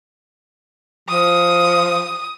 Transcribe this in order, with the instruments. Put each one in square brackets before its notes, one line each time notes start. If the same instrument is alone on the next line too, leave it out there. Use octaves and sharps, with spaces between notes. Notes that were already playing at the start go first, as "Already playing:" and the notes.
[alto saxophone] F3 [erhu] D#6